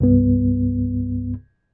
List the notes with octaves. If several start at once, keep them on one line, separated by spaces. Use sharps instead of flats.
C2 G2 B3